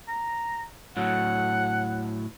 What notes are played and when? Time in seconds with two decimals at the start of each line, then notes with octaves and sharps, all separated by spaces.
0.08 A#5
0.97 A2 F#3 F#5